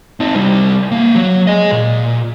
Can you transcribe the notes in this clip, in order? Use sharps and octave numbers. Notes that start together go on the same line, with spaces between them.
C4 D#4
C2 G3
A#3 C4
F#3
G#4 D#5
A#2